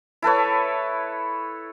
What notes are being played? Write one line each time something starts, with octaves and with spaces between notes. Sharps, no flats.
E4 A4 B4 C#5